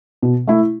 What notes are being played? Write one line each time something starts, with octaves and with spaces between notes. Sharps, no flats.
B2
A3 E4